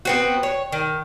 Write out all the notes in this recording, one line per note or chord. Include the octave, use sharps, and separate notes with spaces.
B3 C4 F#4
C#5
D#3